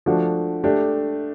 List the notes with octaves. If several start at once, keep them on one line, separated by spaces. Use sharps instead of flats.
F3 A3 D4 F#4
A3 D4 G4